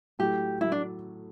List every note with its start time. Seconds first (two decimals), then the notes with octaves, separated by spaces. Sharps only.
0.19 A2 F#3 A3 G4
0.61 A2 F#3 A3 E4
0.72 D4